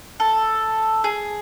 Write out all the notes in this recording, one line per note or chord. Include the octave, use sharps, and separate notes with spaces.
A4
G#4